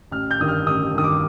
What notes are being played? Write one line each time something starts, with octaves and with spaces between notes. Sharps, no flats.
A1 F6
G6
G2 D#3 D#6
F6
A1 D#6
G2 D#3 D#6
D6